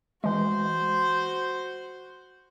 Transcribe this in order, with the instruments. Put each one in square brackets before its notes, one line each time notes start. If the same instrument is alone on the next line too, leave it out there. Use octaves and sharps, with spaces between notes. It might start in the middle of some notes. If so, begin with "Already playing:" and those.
[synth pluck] E3 G#3 [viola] F#4 C5